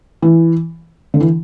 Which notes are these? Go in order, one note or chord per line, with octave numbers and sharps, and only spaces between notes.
E3
D3
E3